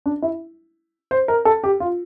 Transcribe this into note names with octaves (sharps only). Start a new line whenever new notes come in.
D4
E4
C5
A#4
A4
G4
F4